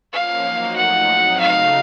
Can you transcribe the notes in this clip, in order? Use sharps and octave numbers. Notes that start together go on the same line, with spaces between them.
F3 A#3 C#4 F5
F#3 A#3 D#4 F#4 C5
A2 F3 A3 D#4 F#5
F#3 C4 D#4
C#3 A3 D#4 F#4 F5